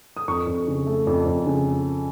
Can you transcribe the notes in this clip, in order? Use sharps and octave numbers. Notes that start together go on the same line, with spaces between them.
D#6
F2 C#6
F2
C#3
A3
F2
F2
C#3